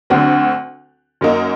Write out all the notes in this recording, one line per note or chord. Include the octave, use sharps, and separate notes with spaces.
D2 D3 F#3 C4
F#2 F#3 A#3 D#4